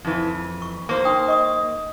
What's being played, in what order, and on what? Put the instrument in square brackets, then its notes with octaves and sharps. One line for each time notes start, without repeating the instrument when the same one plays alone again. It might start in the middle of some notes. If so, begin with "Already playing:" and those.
[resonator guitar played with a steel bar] F2 E3
[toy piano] C#6
[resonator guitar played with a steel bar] A#3 C5 [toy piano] C6 C#6
[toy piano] D#4 G5 D#6
D#5 C#6 D#6